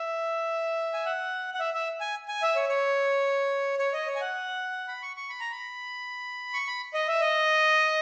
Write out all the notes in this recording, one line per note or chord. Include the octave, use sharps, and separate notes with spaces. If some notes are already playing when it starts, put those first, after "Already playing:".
Already playing: E5
G#5
F#5
F#5
E5
E5
G#5
G#5
E5
C#5
C#5
C#5
D#5
C#5
G#5
F#5
B5
C#6
C#6
B5
A#5
B5
C#6
B5
D#5
E5
D#5